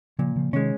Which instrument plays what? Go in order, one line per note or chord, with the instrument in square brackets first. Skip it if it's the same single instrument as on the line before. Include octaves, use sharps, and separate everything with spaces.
[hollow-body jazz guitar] A#2 [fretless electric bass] C#3 F3
[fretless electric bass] C#3 F3
[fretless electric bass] C3 D#3 [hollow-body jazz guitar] G#3 C#4